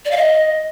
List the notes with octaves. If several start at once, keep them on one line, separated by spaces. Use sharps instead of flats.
D5
F5
D#5